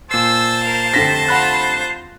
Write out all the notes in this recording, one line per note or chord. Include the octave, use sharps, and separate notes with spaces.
A#2 C5 A5 E6 C7
A#4 F5
F1 D3 C4 A#6 B6
F4 F#5 B5 F#6